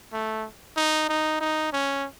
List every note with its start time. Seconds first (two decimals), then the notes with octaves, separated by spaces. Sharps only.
0.13 A3
0.76 D#4
1.09 D#4
1.40 D#4
1.73 C#4